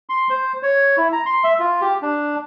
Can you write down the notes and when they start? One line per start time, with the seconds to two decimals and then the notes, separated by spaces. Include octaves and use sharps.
0.09 C6
0.30 C5
0.63 C#5
0.97 E4
1.12 A#5
1.26 C6
1.44 E5
1.59 F4
1.81 G4
2.02 D4